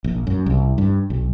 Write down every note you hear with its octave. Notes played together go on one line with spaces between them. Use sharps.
A#1
F#2
C2
G2
B1